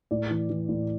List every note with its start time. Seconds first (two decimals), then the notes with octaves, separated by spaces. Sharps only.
0.11 A2 D5
0.30 E3
0.50 E3
0.69 A2